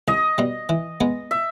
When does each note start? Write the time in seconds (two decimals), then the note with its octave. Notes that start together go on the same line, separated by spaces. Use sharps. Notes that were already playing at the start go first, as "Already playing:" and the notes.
0.08 C2 D#5
0.38 B2 G3
0.69 E3
1.01 G#3 B3
1.31 E5